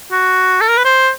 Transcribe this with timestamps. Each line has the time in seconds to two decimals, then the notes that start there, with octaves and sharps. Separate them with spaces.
0.12 F#4
0.61 A4
0.68 A#4
0.77 B4
0.85 C5